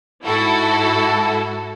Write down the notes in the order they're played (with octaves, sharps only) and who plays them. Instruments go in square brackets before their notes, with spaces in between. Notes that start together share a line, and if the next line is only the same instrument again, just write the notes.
[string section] G#2 E4 F#4 A4